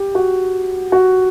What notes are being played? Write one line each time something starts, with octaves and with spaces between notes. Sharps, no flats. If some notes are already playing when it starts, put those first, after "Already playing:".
Already playing: G4
F#4
F#4